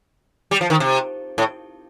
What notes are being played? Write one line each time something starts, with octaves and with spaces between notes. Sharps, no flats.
G3
F3
D#3
C3
A2